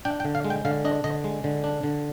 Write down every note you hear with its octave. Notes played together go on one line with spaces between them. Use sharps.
D4 G5
G5
D3
F5
G#3
G5
D3 F5
D4 D#5
D3 D#5
G#3
D3
D4
D3